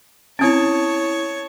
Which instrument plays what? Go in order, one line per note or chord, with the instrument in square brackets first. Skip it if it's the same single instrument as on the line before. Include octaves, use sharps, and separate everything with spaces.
[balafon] C4 C#4 [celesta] E4 D#6 D7 [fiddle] C#5 A5